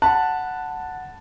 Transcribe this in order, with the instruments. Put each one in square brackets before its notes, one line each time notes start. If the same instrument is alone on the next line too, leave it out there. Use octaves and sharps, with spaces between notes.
[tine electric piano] F#5 B5 F#6 [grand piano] A5